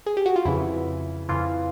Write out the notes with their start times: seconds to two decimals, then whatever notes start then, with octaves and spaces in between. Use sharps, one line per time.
0.06 G#4
0.17 G4
0.26 F#4
0.36 F4
0.45 F2 C#3 E3 E4
1.29 F2 C#3 E3 F4